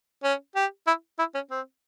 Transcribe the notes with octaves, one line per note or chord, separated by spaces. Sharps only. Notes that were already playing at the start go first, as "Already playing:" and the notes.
C#4
G4
E4
E4
C#4
C4